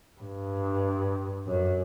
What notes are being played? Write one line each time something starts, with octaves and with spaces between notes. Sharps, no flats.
G2
F#2